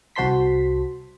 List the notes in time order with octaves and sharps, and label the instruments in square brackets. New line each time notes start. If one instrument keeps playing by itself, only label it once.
[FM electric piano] C2 F#4 C5 A5 C6 B6